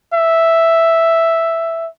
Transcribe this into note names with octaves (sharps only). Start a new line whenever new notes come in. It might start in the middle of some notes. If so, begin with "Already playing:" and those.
E5